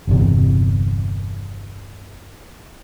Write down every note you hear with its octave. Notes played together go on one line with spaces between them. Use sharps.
G1 E2 C3